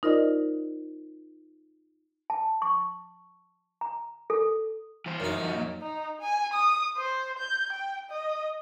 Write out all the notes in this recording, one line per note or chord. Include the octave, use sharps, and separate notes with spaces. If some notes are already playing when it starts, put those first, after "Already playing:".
D#4 F4 A#4 C5 D5 D#5
A5
C#6
A#5
A4
E3 C5
F#2 D#4
F3 F#3
A#2
D#4
G#5
D#6
C5
G6
G5
D#5